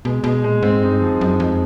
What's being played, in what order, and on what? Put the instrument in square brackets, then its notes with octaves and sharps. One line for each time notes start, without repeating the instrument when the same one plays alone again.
[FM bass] B2 [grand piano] G#3
[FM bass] B2 [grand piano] G#3
[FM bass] A#2 [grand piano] G#3
[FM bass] G#2 [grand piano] C4
[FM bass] G2 [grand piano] D#4
[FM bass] F#2 [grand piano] F3
[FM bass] F#2 [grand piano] D#4
[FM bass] F2 [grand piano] G#3